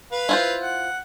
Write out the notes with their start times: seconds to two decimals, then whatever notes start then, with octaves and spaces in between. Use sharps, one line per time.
0.12 B4 F5
0.29 E4 F4 C5
0.61 F#5